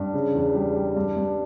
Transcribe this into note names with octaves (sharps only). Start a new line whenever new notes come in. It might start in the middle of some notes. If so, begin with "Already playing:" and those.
Already playing: G2
C#3
E2
G3
G3
G2
G2